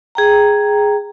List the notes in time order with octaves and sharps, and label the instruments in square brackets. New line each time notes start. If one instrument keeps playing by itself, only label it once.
[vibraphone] G#4 G5 A#5